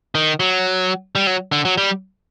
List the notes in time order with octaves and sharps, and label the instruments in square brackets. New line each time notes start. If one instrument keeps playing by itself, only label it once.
[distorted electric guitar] D#3
F#3
G3
F#3
D3
F#3
G3